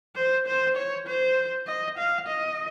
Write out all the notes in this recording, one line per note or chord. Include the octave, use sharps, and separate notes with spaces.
C5
C5
C#5
C5
D#5
F5
D#5